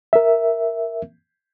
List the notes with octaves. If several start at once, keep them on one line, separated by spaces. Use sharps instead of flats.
A#4 E5